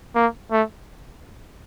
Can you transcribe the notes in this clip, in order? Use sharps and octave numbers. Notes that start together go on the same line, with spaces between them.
A#3
A3